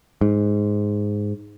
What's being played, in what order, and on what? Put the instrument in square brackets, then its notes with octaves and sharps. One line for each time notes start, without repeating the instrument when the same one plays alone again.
[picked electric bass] G#2